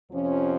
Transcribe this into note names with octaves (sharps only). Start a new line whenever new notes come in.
F2 C3 F3 C#4